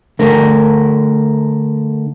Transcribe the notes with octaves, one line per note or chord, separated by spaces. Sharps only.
D3 A3 A#4